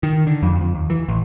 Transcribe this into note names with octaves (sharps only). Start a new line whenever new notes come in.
D#3
D3
F2
F2
D#2
E3
A1